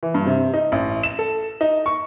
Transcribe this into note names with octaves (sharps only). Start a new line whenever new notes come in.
E3
G2
C3
D#4
A1
E7
A4
D#4
C#6